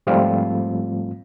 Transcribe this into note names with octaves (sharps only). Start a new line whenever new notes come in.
G#2 F3 G3 A3 C4 F4